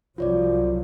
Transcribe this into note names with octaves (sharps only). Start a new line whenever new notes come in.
C2 F3 F#3 F4 C#5 D5